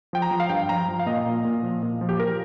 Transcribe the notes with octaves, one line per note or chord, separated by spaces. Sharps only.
F3 G5
A#5
F3
F5
G2 G5
F3 A#5
F3
F5
A#2 D#5
A#2
A#2
F3
A#2
F3
G4
F3 A#4